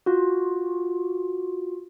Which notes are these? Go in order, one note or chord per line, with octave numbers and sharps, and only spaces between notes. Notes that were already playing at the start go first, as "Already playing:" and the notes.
F4 F#4